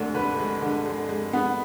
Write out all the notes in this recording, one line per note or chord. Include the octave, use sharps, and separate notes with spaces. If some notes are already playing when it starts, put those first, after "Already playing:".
Already playing: D2 D3 D5
D3 B4
G#3
D3
G#3
G#3
B3